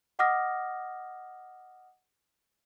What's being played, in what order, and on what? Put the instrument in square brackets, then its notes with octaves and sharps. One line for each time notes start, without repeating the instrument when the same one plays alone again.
[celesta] D#5 F#5 D6 D#6 F6 A#6